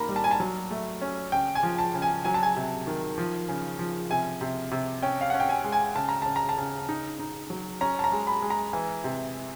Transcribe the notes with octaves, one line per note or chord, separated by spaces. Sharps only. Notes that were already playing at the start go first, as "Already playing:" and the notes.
Already playing: D#3 A#3 A#5 B5
G3
A5
G#5
A5
F#3
A3
C#4
C#3 G5
G#5
F3
A5
C#3
G#5
F#3 G#5
A5
G#5
C3
D#3
F3
C#3
F3
C3 G#5
C3
C3
C#4 G5
F5
C#4 F#5
G5
G#5
G#3
G#5
C#3 A5
A#5
C#3 A5
A#5
A5
C#3
D#4
D#4
F#3
C#4 A#5
A5
A#5
G#3
B5
G#3
A#5
E3
C3